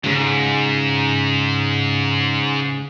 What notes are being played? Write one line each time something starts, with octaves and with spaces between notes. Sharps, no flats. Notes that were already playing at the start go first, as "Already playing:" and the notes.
G#2 C#3 G#3